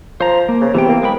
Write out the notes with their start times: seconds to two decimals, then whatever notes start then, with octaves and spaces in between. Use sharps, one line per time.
0.21 F3 C5 A#5
0.49 A#3
0.61 C#3
0.74 C3 E3 B3 G5
0.89 A#3
1.03 G#3 G5 B5